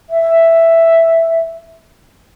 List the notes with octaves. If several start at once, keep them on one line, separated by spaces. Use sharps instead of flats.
E5